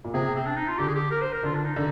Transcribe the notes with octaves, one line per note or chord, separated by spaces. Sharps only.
A#2
C3 G#4
C4
D4
D#4
F4
D3 G4
G#4
G4
A#4
C5
A#4
D3 F4
D4
D#4
D3